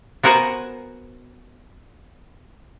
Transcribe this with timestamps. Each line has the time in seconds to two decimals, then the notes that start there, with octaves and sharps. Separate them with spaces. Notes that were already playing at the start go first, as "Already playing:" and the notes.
0.23 B3 F#4 A#4 C5 F#5 G#5